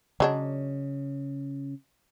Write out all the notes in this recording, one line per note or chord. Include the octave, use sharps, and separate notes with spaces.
C#3 F#3 G#3 D4